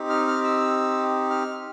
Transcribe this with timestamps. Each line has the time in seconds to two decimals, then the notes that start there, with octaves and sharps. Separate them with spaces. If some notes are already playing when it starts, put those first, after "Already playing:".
Already playing: C4 D#4 G4
0.09 F6
0.27 F6
0.44 E6
1.30 F6